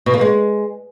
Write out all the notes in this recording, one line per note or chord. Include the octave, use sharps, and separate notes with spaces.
B2
A#3
G#3